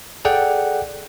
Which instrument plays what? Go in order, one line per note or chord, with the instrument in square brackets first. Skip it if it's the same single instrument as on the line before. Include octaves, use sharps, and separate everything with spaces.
[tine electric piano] G#4 A4 D5 F#5 G5